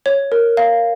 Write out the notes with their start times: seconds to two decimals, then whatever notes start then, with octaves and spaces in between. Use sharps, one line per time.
0.06 C#5
0.32 A#4
0.57 F5